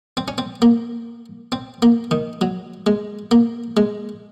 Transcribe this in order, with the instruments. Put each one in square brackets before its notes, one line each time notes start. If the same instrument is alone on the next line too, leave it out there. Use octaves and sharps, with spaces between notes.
[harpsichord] C4
C#4
C4
A#3
C4
A#3
D#3
F#3
G#3
A#3
G#3